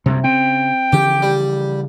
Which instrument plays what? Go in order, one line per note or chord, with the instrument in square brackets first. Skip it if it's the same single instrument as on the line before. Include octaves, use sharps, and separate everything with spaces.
[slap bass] F#1 C2 F#2 [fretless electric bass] C3
[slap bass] C#3 [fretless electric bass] C4 [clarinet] G5
[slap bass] C#3 E3 F3 [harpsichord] G4
[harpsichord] G3